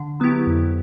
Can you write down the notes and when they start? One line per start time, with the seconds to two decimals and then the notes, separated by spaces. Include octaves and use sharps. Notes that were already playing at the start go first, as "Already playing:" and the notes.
Already playing: D3
0.20 F#3 B3 E4 G4
0.47 F2